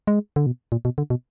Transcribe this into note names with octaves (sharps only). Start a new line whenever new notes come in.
G#3
D3
B2
A#2
B2
D3
B2